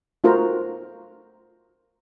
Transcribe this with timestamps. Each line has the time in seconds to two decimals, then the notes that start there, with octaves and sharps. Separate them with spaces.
0.24 A3 F4 F#4 A#4 C5 A#5